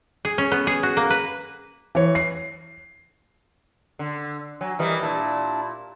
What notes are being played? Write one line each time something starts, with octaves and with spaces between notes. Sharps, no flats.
G#4
C#4
B3
G#4
F#4
A#3
B4
E3 C#5
C7
D3
F#3 G#5
E3 G3 A#4 D#5
A#2 D4 E4 A5